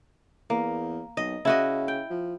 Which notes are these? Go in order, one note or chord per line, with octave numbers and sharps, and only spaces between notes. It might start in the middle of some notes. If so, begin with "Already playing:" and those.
E2 A#3
B1 D#5
C#3 E4 F#4 D#5
G5
F3